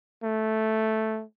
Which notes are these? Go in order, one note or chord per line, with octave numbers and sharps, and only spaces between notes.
A3